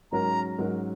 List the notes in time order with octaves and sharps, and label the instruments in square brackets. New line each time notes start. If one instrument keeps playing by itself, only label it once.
[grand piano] G#2 F#3 C#4 F#4 A#4 [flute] A#5
[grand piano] G#2 F#3 C#4 F#4 A#4